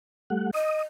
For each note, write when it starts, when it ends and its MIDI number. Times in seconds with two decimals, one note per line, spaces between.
0.30 0.51 55
0.30 0.51 57
0.30 0.51 78
0.54 0.82 75
0.54 0.82 87